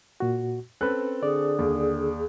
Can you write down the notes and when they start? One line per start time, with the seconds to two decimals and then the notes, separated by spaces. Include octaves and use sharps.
0.20 A#2 F#4
0.81 C4 C#4 A4 B4 F#6
1.23 D3 G#4 D5
1.59 D#2